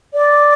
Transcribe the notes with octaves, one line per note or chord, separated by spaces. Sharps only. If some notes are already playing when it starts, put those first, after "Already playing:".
D5